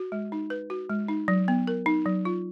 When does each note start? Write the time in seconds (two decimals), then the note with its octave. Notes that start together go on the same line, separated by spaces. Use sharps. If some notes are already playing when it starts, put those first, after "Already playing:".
Already playing: F#4
0.12 G#3
0.32 D#4
0.50 B4
0.70 F#4
0.90 G#3
1.08 D#4
1.28 F#3
1.48 B3
1.67 A#4
1.86 D#4
2.06 F#3
2.25 F4